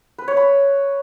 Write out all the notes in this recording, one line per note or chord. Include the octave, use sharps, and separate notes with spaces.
B4
C#5
B5